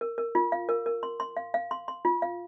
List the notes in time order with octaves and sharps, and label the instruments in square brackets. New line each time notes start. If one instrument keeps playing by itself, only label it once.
[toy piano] A#4
A#4
F4
F5
A#4
A#4
C6
C6
F5
F5
C6
C6
F4
F5